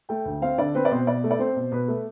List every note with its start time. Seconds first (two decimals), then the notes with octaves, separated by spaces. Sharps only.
0.09 A3 G5
0.25 D2
0.42 C4 F5
0.58 D3 D5
0.75 C4 B4
0.85 D5
0.91 B2 C5
1.07 B2 D5
1.24 A3
1.31 D5
1.39 C4 C5
1.56 B2
1.72 B2 B4
1.88 A3